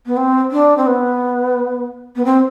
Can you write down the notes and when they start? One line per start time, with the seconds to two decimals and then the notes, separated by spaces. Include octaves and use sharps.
0.06 B3
0.17 C4
0.51 D4
0.77 C4
0.87 B3
2.16 B3
2.25 C4